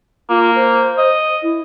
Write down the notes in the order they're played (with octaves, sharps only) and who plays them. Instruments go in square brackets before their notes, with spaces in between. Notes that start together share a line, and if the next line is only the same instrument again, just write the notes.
[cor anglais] A#3 [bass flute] F4
[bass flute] C5
[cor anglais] D#5
[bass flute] E4